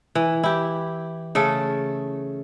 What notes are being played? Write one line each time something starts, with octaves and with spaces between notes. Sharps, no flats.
E3
E4 G4
C#3 A3 A4